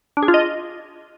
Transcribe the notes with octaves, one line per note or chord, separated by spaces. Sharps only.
D4
G#4
F4
D#5